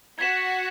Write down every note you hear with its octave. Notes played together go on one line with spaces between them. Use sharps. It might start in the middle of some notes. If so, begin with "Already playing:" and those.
F#4 G#6 B6 E7